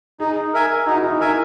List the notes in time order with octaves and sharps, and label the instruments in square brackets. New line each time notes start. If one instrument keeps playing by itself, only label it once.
[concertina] D#4 [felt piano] G#4
[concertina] A#4 E5 G#5
[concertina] D#4 [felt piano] F#4
[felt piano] E4
D#4
[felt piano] E4 [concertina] A#4 E5 G#5